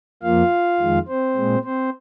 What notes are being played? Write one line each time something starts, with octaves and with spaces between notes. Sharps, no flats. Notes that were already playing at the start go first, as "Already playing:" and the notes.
F2 F3 A#3 F4 F5
F2 D#3 G#3
C4 C5
A#2 G#3
C4 C5